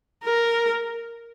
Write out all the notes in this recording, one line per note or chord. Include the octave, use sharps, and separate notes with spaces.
A#4